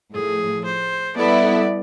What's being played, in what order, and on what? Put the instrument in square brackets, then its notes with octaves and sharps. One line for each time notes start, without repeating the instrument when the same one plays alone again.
[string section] A2 F3 A3 [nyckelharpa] G#4
[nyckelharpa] C5
[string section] G3 B3 E4 A4 [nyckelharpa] D5